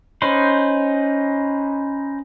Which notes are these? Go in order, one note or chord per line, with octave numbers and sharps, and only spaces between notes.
C#4 D#4 B4 C5